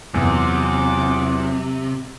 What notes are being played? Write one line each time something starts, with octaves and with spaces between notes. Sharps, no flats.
E2 C3 F#3 F4 F#5 D6